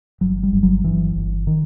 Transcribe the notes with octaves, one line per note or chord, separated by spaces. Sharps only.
G1 F#3
G3
G1
F#3
G1 E3
G1
D#3